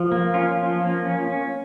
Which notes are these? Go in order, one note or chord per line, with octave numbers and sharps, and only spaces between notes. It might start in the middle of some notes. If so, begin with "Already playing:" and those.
Already playing: F3
A#3
C#4 F4
F3
A#3
C#4
C#4